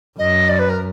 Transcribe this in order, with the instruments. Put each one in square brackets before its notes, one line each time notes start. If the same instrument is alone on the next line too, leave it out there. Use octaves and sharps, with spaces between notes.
[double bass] F#2 [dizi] D#5
[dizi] D5
B4
A#4